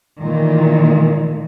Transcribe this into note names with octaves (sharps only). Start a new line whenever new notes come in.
A#2 D#3 E3 A3